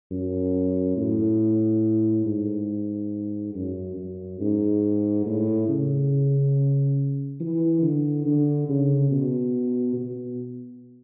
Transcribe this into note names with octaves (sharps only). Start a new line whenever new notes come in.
F#2
A2
G#2
F#2
F#2
G#2
A2
C#3
E3
D3
D3
C#3
B2
B2